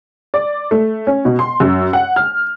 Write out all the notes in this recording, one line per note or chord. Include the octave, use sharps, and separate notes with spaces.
D5
A3
C#4
B2
C6
F#2
F#5
F6